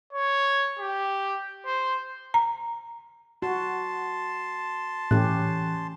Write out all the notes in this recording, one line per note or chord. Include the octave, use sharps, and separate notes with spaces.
C#5
G4
C5
A#5
F#4 A5 C6
A2 E3 C#4 G4 F#6